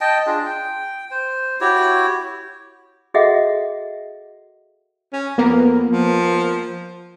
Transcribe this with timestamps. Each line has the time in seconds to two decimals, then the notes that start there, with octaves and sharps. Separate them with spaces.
0.01 D#5 G5 A5
0.27 D4 F4 G#4
0.46 G5
1.11 C5
1.61 E4 F#4 G4 C#5
3.14 F#4 G#4 A4 D#5 E5 F#5
5.13 C#4
5.38 F2 A#3 B3 A#4
5.88 F3